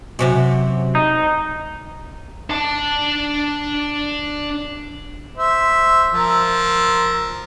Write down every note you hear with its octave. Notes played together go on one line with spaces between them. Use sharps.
F#2 C3 F#4
D#4
D4 A5
C5 E5
F3 A#4 E6